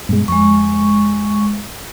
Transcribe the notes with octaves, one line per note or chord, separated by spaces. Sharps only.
G2 B2 G#3
F2 G#3 C#6